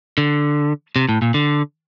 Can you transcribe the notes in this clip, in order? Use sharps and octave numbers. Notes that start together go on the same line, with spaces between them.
D3
C3
A2
A#2
D3